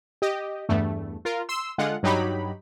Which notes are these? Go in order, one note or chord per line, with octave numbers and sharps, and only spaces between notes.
G4 D#5
E2 G2 A3
F4 A#4
C6 E6
D3 G#3 F4 F#5
G2 F#3 D#4 G4 B5